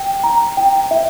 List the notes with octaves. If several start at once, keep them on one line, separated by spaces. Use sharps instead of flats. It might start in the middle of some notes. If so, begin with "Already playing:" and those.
Already playing: G5
A#5
G5
E5